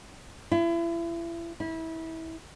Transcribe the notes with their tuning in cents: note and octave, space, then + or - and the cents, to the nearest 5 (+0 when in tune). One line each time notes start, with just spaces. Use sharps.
E4 +35
E4 -25